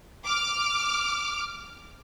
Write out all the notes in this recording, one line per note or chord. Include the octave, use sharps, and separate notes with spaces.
D6 F6